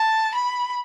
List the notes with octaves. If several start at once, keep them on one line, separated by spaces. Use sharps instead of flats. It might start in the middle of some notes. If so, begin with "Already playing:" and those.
Already playing: A5
B5